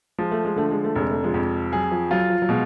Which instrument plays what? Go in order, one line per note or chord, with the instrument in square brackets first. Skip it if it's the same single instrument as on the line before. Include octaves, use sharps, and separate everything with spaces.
[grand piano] F3 [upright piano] G#3
[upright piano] A3
G#3
[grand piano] D3 [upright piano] A3
[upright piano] G#3
A3
[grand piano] F1 [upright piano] G#3
[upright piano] A3
F3 G#3
[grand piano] F2
[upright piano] F#3 [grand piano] G#4
[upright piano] F3
[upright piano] F#3 [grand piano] F4
[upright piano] F3
F#3
[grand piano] B2 [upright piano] F3 G#3